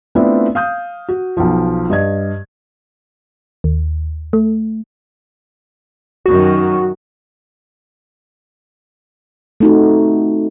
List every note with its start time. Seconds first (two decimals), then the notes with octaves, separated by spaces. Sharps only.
0.15 A3 B3 C4 D4 E4 F4
0.55 F5 D#6 G6
1.09 F#4
1.37 B1 F3
1.90 G2 D#5 G#6
3.64 D#2
4.33 A3
6.26 F#2 D#3 F#4
9.60 A3 C4 D#4 F4 F#4